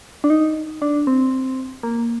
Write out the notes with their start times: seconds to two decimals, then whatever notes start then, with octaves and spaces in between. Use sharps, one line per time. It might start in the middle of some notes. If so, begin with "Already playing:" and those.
0.24 D4
0.30 D#4
0.82 D4
1.07 C4
1.83 A#3